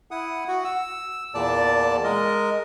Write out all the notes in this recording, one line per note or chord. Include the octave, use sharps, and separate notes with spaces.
E4 F#5 D#6
F#4 F#5
E6
E2 A#2 D5 A5
G#3 A#4 D#5